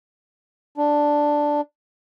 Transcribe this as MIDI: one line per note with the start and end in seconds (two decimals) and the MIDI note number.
0.77 1.61 62